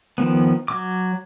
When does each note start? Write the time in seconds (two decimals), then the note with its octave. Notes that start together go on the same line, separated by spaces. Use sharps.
0.18 D#3 F3 B3
0.68 F#3 D6